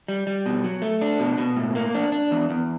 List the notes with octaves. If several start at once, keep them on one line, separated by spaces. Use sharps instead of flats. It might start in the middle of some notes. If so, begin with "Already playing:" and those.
G3
G3
B2
F#3
A3
D4
B2
B2
A2
A#3
D4
D4
E2
E2